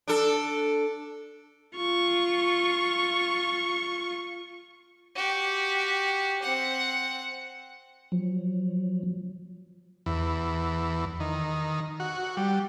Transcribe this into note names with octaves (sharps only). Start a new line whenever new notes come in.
D4 A4
F4 C#6
F#4 G4
C4 F#5
F3 F#3
E2
D#3
F#4
G3